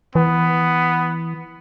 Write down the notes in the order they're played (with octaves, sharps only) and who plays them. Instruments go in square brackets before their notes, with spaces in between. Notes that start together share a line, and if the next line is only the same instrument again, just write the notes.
[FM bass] E3 [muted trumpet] B3